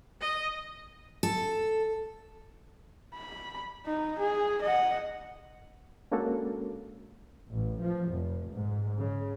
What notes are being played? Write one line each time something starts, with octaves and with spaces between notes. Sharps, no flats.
D#5
A4
B5
D#4
G#4
D#5 F#5
G#3 A#3 C#4 D4 F#4 A4
A1
F3
F1
G#2
C#3